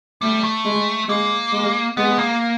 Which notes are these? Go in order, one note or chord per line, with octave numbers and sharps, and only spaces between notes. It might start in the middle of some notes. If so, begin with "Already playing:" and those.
G3 A3
A3
G#3
G#3 A#3
G#3
G#3 B3
A#3